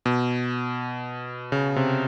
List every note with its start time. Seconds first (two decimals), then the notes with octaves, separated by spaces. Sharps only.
0.06 B2
1.52 C#3
1.76 C3